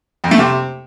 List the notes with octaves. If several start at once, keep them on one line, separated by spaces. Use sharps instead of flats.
F2
A3
C3